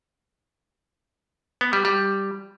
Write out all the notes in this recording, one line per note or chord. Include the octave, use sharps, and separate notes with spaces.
B3
G3
G3